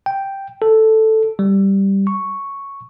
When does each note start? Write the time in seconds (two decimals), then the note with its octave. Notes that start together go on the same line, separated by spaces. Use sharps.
0.06 G5
0.62 A4
1.39 G3
2.07 C#6